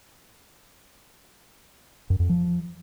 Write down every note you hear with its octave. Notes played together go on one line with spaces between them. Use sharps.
F#2
F2
F3